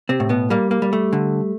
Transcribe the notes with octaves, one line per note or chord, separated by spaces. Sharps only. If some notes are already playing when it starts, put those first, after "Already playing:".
C3 C4
A2
B2 B3
G3 A#3
A#3
G3
A3
D3